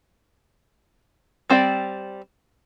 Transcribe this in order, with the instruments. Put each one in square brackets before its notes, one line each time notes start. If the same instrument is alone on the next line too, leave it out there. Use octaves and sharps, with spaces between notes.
[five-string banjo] G3 C4 D5 G5